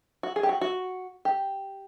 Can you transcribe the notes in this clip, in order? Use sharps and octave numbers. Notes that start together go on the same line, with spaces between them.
F#4
G#4
G4
F#4
F#4
G4